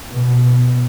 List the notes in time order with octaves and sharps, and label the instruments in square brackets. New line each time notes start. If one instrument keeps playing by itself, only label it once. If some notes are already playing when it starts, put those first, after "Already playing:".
[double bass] B2